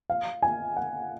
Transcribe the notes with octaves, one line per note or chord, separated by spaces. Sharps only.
F5
G#5
F#5